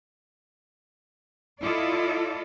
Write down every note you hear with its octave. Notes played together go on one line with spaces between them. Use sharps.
E4 F4 A4 D5 D#5